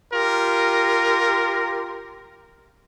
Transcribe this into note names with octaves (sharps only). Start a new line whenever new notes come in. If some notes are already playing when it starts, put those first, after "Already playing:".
F4 G4 A#4